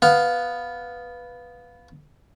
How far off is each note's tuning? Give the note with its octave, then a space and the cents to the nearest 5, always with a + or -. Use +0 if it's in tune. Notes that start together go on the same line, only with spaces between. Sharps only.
B3 +0 F5 +5